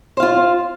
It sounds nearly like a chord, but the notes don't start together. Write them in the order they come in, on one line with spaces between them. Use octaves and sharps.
C5 F5 F4